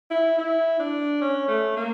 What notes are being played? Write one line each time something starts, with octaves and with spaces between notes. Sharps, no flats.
E4
E4
D4
C#4
A3
A#3